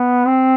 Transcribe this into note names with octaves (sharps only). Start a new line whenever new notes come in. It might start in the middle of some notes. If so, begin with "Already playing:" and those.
Already playing: B3
C4